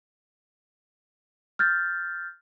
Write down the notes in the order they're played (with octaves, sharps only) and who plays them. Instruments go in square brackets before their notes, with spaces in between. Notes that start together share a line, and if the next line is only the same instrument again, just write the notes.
[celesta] F6 G6 A6